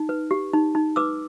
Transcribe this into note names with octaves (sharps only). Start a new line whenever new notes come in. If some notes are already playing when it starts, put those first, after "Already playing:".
Already playing: D#4
B4
G4
D#4
D#4
B4 D6 E6